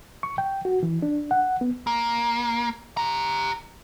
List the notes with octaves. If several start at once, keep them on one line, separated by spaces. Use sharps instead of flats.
C#6
G5
F#4
E3
D4
F#5
B3
A#3
G4 A#5